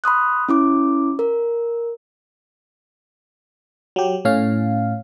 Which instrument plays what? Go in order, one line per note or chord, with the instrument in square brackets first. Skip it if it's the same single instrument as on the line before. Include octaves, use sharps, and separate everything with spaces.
[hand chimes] B5 C6 D#6 F#6
C#4 E4 D6
A#4
[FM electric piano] F#3 G4
A2 C#4 F5